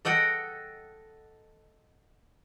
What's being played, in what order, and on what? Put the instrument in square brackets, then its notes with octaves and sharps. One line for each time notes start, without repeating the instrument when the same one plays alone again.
[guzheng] A4 D#5 F#5 G5